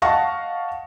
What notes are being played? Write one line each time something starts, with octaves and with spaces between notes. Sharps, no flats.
D#5 F5 F#5 A5 C#6 A#6